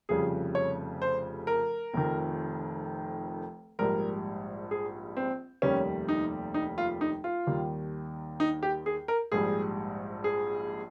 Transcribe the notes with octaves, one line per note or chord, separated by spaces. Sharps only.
F1 F2 C#3 G3 G#4
C#5
C5
A#4
F1 F2 D#3
A#1 G#2 G3 A#4
G#4
C4
F1 D#2 D#3 G3 C#4
D#4
D#4
F4
D#4
F4
D#2 D#3 G3
D#4
G4
G#4
A#4
A#1 G#2 G3 G#4
G#4